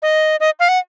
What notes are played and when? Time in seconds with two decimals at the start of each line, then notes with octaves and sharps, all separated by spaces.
0.02 D#5
0.40 D#5
0.60 F5
0.69 F#5